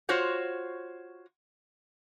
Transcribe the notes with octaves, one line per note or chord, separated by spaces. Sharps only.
F4 F#4 C5 C#5 F#5